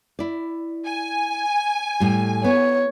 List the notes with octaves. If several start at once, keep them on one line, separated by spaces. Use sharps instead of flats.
E4 D5
G#5
A2 G3
B3 C#5